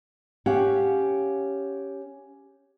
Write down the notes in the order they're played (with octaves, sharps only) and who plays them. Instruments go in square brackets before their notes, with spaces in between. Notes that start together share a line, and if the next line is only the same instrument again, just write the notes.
[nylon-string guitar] C#4 G4 F5 F#5